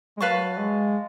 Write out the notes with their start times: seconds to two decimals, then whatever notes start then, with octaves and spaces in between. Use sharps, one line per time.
0.17 G#3
0.21 F#3 B4 F5 A5 C#6
0.58 G#3